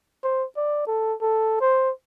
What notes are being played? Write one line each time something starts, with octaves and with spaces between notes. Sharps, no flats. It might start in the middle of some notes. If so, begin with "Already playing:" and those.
C5
D5
A4
A4
C5